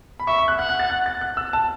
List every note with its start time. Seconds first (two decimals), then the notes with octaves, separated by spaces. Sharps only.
0.20 B5
0.27 E5 C#6
0.38 C#6
0.48 F#6
0.59 F#5 F#6
0.69 F#6
0.80 A6
0.90 F#6
1.06 A6
1.21 F#6
1.37 E6
1.53 A5